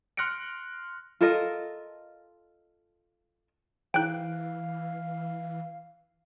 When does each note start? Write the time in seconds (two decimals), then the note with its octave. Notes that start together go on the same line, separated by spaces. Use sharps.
0.17 C6 F6 F#6 A#6 C#7 D7
1.21 F4 A4 A#4 D#5
3.94 E3 E4 G#4 C5 F5 G5 F#6